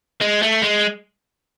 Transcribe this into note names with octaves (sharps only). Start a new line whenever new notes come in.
G#3
A3
G#3